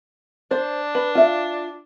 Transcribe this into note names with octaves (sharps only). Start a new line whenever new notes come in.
D4 C5
B4
F4 E5